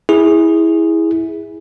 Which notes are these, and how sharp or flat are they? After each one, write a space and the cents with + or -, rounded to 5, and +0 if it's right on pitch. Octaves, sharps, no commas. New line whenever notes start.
E4 -15 G#4 -10